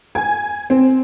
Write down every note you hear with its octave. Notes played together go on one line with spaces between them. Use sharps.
G#5
C4